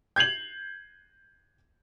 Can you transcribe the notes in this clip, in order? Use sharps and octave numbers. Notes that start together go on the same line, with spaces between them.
G6 G#6 C7 F7 F#7